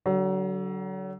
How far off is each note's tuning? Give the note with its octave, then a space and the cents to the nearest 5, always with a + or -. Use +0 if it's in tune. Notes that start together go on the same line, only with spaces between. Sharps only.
D3 -10 F#3 +35